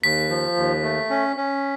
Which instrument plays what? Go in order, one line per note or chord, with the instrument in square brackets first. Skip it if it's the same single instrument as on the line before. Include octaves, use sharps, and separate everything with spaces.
[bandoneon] D#2 [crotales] B6
[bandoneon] F3
D#2
A3
C#4
C#4